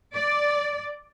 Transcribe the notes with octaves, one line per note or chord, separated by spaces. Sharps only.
D5